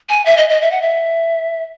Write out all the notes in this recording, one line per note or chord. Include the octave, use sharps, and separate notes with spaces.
G#5
E5
D#5
D#5
E5
F#5
E5